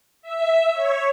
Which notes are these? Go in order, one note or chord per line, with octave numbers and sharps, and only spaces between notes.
E5
C#5